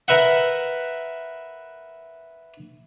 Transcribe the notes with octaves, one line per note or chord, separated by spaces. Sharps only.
A#4 B4 E5 F#5